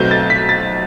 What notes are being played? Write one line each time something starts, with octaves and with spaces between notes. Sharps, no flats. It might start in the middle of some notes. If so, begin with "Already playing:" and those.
Already playing: B1 B2 A3 C4 G6
A6
B6
A6